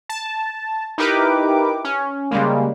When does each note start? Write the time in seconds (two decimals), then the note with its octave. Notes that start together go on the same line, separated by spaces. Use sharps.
0.09 A5
0.98 D#4 E4 G4 A#4 B4 D6
1.84 C#4
2.31 C#3 G3 G#3 A#3